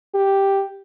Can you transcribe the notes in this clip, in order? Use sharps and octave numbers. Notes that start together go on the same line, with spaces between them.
G4